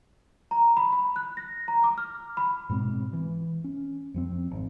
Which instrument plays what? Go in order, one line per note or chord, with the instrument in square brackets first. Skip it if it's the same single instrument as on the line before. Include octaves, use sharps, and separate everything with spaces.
[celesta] A#5
B5
B5
F#6
A#6
A#5
D6
F6
B5
[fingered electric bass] G#2 B2 G#3 C4
E3
C#4
F2 F3 C4
G#1